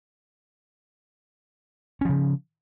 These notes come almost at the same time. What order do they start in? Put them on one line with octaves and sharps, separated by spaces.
C#4 F3 C#3